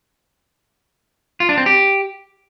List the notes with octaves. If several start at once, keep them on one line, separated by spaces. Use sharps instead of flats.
F4
D4
C4
G4